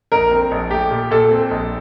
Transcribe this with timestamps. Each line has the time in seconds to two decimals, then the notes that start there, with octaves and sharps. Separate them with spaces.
0.12 A#1 A#4
0.31 C4
0.51 A#1
0.70 A3 G4
0.91 A#2
1.11 A#2 A4
1.31 C4
1.51 A#1